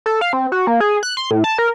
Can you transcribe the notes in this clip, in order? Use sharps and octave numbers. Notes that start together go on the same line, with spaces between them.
A4
F5
C4
F#4
A#3
G#4
F#6
C6
A2
A5
A#4